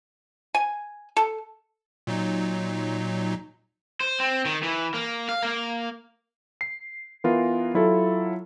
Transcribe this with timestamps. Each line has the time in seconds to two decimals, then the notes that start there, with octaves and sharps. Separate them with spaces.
0.55 G#5
1.17 A4
2.07 A#2 F#3 D#4
4.01 C5
4.20 C4
4.45 D#3
4.63 E3
4.94 A#3
5.29 F5
5.43 A#3
6.61 C7
7.24 E3 B3 F4 A#4
7.74 F#3 E4 F4 A4